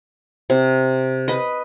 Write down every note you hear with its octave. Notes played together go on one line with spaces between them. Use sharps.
C3
B4 D#5